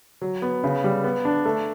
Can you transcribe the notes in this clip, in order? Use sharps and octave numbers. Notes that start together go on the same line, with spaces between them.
F#3
B3
C#3
G3
B3
D4
A3